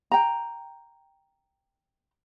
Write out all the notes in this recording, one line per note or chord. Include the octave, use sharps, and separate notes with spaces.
G5 A#5